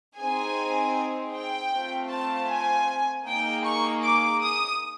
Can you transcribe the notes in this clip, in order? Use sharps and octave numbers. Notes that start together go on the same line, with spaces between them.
C4 D#4 G#4 G#5
G5
A3 C4 F4
A5
G#5
A#3 D#4 G#4 G5
C#6
D6
D#6